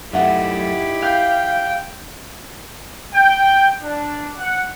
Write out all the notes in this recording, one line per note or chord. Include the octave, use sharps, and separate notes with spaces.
F#2 A3 D#4 E4 G4 E5 F#5
F5 G5 G6
G5
D4
F#5